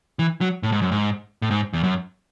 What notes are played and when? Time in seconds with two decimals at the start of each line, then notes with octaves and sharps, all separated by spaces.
0.19 E3
0.41 F#3
0.63 A2
0.72 G#2
0.82 F#2
0.92 G#2
1.42 A2
1.51 G#2
1.73 E2
1.84 F#2